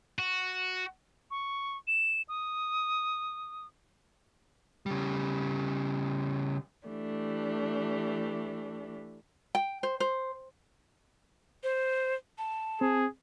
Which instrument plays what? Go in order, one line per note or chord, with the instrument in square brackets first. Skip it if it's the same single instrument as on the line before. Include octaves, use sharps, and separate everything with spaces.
[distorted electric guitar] F#4
[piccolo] C#6
E7
D#6
[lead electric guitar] C#3 G3
[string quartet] E3 A3 D4 G4
[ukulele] G5
C5
C5
[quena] C5
A5
[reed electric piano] C4 [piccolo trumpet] G#4